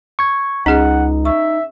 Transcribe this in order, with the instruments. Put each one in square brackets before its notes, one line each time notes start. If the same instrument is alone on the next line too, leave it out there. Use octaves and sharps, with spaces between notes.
[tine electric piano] C#6 G#6
[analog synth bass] C#2 [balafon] C#4 G#4 D#5 [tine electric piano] D#4 [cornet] F#5
[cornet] E5 [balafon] C#6